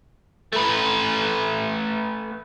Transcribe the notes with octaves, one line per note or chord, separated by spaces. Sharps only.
A3 B4